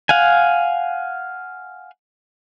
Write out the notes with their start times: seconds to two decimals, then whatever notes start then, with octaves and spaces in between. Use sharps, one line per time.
0.09 F5 F#5 G#5